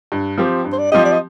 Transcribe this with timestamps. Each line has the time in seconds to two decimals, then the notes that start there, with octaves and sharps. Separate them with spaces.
0.12 G2
0.38 F3 C4 G4
0.64 G2
0.72 C5
0.78 D5
0.92 F3 C4 G4 D#5
1.05 D5
1.12 D#5